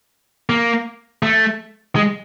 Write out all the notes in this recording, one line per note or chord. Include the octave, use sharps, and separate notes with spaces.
A#3
A3
G#3